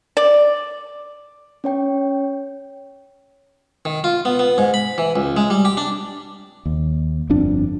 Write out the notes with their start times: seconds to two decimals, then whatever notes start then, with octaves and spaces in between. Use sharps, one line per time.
0.17 D5
1.64 C#4 C#5 G5
3.85 D#3
4.04 F4
4.25 B3
4.39 B3
4.58 G#2
4.74 B5
4.98 E3
5.16 C#2
5.37 G#3
5.50 G3
5.65 G4
5.77 D4
6.66 D#2
7.30 G1 F2 D4